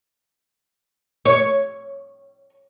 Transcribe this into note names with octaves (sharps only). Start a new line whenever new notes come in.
C#5